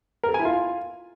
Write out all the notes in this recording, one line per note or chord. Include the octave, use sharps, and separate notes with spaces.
A#4
A4
G#5
E4
F4